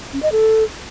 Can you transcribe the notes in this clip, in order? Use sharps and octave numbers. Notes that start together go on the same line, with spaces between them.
C#4
D#5
A4